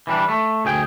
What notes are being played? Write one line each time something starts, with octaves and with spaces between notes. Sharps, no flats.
E3 G3 D4
A3
D2 G#4 G5